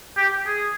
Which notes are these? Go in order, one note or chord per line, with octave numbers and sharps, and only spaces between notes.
G4
G#4